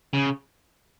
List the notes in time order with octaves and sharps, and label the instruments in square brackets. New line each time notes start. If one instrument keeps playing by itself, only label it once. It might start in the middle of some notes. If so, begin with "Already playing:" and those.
[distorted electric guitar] C#3